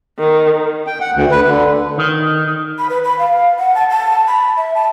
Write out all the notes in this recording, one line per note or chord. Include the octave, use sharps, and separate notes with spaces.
D#3
G5
F#5
D2
B4
D3
D#3
B5
B4
B5
F5
F#5
A5
A5
B5
E5
A5